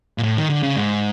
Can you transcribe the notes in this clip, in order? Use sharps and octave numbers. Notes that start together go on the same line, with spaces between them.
A#2
A2
D#3
D3
C#3
G#2